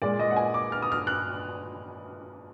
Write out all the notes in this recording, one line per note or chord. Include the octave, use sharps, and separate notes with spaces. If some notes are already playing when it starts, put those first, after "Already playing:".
A#2 G#3 D5
D#5
F#5
G#5
D6
F6
D#6
F6
F#6